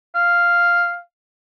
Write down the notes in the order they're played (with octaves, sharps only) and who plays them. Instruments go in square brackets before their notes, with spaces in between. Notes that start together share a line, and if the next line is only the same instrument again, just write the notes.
[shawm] F5